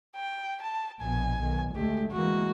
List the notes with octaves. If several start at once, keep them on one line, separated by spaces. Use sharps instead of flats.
G5
A5
A#1 B2 G#5
B1 D#3
D2 G#3 A3 G4
E3 G#3 A#3 F#4